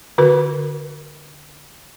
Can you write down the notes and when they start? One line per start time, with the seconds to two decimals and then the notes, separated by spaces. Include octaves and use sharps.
0.18 D3 F#4 A#4 B4